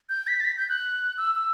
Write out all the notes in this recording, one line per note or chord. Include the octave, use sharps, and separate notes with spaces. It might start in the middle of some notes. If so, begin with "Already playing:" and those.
G6
B6
A6
B6
G6
F#6
E6
E6